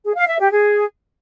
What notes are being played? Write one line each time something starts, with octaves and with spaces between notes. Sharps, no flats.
G#4
F5
E5
G4
G#4